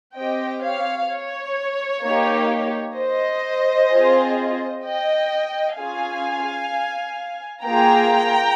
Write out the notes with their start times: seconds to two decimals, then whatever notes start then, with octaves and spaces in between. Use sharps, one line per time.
0.16 C4 G4 D#5 G5
0.63 C#5 F5
1.10 C#5
2.03 A#3 D#4 G4
2.96 C5 D#5
3.90 C4 F4 G#4
4.83 D#5 G5
5.77 C#4 F4 G#4 F5 G#5
7.64 A#3 F4 G#4 G5 A#5